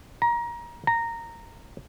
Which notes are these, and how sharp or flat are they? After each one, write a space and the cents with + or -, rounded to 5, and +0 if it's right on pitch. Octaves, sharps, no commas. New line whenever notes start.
A#5 +25
A#5 -10